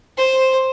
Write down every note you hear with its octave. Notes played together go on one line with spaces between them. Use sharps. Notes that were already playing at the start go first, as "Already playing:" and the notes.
C5